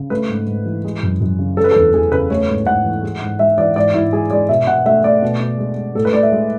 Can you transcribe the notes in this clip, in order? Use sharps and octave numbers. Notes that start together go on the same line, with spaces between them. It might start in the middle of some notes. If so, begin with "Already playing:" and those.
Already playing: C#3
A3 B4
G#2
G#2
E3
G#3
F#2
F#2
C#3
G#3 A4
B4
E2 A4
E2 G#4
C#3 B4
A3 C#5
G#2
G#2 F#5
E3
G#3
G#2
G#2 E5
E3 D5
G#2 D5
G#2 E4
G#3 G#4
G#3 D5
B2 E5
B2 F#5
A3 E5
A3 D5
B2
B2
G#3
G#3
A2 A4
B4
A2 D5
E5
G#3